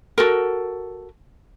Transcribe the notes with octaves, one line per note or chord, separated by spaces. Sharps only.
F#4 A4 A#4